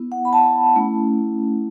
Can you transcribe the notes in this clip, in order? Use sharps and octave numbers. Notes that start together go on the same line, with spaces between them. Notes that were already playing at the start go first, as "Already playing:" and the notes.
Already playing: B3 E4
F#5
B5
A5
A3 C#4 E4